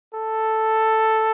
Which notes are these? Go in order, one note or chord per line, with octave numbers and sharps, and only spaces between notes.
A4